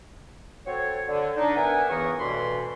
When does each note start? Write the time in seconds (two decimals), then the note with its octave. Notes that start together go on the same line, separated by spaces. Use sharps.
0.66 C4 F#4 A4 C#5
1.08 D3
1.37 D4 D#4
1.56 B3 D4 A#4 E5 F#5 G#5
1.89 E2 C#3 E3 B3 A#4 C#6
2.18 D2 G2 B2 E3 B5 C6